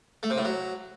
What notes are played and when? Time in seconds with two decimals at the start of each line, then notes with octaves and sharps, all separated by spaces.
0.23 A3
0.30 C3
0.38 A2
0.45 F#3